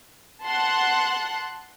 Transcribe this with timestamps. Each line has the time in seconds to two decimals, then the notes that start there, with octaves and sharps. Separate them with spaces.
0.44 F#5 A5 C6 F#6